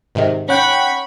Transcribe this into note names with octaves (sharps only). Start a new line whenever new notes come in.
G#2 C3 D#3
C#4 F#5 G5 B5 C#6